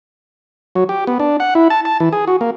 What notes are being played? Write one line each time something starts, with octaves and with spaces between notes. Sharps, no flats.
F#3
G4
B3
D4
F#5
E4
A5
A5
E3
G#4
F#4
A#3